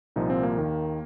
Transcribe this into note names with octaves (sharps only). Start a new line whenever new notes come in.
C2 A#2 F3 D#4
C4
A#3
D#2 D#3